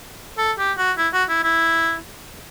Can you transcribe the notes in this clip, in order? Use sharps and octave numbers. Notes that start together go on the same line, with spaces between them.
A4
G4
F#4
E4
F#4
E4
E4